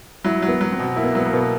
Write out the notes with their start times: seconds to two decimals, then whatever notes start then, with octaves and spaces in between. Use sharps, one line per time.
0.25 F#3 E4
0.42 F#3
0.48 B3
0.61 F#3
0.72 C4
0.79 B2
0.96 A#3 E4
1.04 B3
1.12 A#3
1.15 F#3 B3
1.26 A#3
1.33 B2 B3
1.40 A#3